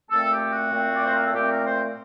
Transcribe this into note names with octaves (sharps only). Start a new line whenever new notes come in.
A#2 A3 C4 A4
G4
F#4
A#2 A3 C4
D5
C5
A#4
A4
A#2 A3 C4 G4
A#4
C5